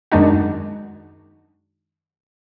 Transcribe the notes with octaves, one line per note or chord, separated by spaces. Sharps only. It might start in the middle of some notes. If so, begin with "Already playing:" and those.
F#2 D#3 G#3 D4 D#4 F#4